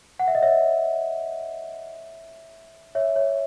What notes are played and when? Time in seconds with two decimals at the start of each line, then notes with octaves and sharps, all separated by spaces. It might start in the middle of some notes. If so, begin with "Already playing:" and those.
0.19 F#5
0.28 E5
0.35 D#5
0.42 C#5 E5
2.95 C#5 E5
3.16 C#5